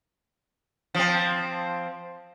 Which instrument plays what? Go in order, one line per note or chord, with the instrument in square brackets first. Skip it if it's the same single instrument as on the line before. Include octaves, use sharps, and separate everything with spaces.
[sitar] F3 C4